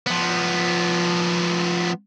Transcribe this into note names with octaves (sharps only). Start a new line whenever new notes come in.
F3 B3